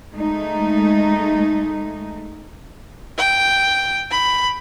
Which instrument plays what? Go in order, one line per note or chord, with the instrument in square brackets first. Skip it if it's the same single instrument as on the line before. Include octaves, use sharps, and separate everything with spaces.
[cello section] G#3 A3 D#4
[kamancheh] G5
B5